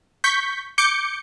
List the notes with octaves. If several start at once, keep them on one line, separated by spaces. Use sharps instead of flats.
C#6 G6 B6
D6 G6 C#7